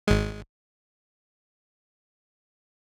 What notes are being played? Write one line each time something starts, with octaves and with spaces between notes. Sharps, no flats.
G#1 G#3